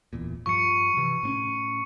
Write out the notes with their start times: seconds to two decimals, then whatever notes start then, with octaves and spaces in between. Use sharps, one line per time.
0.13 D1 E2 A#2
0.46 G2 F3 C#6 C#7
0.97 C3 E3
1.23 A2 C4 C#4